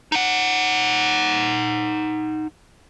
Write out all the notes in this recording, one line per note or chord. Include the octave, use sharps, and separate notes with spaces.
D#4 F#5